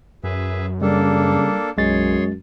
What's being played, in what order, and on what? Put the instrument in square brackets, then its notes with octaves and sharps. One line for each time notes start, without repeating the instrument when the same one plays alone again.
[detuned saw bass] F#2 [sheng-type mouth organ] G#4 B4 E5
[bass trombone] C#3 [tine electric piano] G3 [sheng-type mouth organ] A#3 D4 A4
[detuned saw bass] B1 [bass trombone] F#2 [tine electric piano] G#3 A6 [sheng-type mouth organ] G#4 C#5 C6